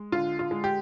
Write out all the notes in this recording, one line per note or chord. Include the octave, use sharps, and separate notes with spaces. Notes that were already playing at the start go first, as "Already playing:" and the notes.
Already playing: G#3
D3 F4
F4
G#3
G4